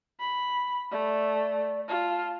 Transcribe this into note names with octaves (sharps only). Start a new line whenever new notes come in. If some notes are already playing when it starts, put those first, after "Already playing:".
B5
A3 D5
F4 A5